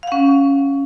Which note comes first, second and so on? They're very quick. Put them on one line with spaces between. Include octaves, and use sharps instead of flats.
F5 F#5 C#4